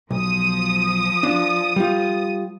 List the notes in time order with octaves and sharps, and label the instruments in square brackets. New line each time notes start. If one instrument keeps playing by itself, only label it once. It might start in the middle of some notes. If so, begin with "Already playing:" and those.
[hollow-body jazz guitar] B1 [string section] F3 D#6
[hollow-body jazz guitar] D4 F4
G3 F4